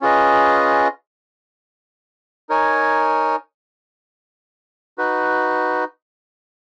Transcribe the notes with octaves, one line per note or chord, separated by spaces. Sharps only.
C#4 F4 G#4 B4 D#5
D#4 A#4 C#5 G#5
D#4 F#4 B4